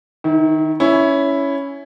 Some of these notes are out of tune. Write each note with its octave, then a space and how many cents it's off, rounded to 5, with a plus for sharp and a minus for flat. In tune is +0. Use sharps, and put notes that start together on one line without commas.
D#3 +0 E4 -40
C#4 +10 E4 +0